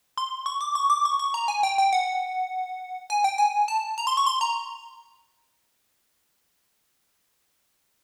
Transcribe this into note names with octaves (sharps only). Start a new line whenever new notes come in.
C6
C#6
D6
C#6
D6
C#6
C#6
A#5
G#5
G5
G5
F#5
G#5
G5
G#5
A5
A#5
C6
C#6
C6
A#5